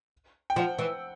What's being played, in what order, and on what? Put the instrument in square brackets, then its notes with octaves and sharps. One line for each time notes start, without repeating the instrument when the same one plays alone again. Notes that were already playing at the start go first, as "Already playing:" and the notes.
[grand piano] G5
[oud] F3 [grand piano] F#5
[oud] E3